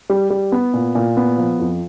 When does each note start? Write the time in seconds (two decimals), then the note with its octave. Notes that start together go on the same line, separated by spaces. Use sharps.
0.10 G3
0.30 G3
0.52 B3
0.74 A#2
0.95 A#2
1.17 B3
1.38 F3
1.60 F2